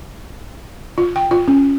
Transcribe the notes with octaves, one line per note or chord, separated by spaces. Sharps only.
F4
G5
F4
C#4